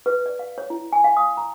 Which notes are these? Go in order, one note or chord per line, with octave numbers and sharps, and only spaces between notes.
B4
D5
F5
C#5
E4
G#5
F5
D#6
A#5